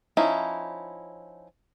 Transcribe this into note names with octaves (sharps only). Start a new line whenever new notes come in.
F3 C#4 D#4 E4